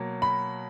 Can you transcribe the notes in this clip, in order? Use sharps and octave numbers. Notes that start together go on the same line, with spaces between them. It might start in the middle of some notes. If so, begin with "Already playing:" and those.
Already playing: B2 F#3 A#3
B5